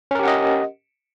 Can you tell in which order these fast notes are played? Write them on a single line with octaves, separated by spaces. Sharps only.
C#4 A#4 G4 F#5 D#5